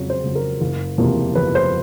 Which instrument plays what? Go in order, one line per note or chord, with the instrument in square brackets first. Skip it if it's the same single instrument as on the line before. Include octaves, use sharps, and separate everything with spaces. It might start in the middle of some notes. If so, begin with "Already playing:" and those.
Already playing: [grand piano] F2 C#3 F#3 C#5
C5
C#3 F#3
A#4
F#1
E2 C3 F3 A#3
F#1 B4
C5